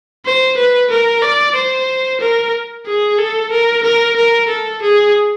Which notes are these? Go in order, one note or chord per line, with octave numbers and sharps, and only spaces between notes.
C5
B4
A#4
D5
C5
A#4
G#4
A4
A#4
A#4
A#4
A4
G#4